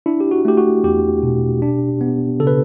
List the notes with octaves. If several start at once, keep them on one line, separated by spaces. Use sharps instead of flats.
D4 E4
G4
F#4
A3 G4
F#4
E2 G4
B2
D4
B3
C#3 A4
B4